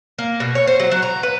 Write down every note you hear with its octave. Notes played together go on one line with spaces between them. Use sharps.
A#3
B2
C#5
C5
F#3
F#3
A#5
B4